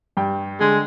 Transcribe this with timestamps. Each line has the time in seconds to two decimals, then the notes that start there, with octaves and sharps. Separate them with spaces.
0.17 G2 G5
0.61 D3 G#3